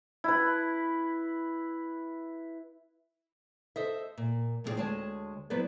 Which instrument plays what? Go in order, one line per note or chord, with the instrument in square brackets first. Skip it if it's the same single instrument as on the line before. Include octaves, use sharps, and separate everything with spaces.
[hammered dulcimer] E4 B4
[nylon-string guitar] A4 C5 D#5 E5
A#2
A2 F3 B3 C4 G#4 D5
D2 G#3 C#5 D#5 G#5 A5
F#3 B3 E4 B4 C5 D5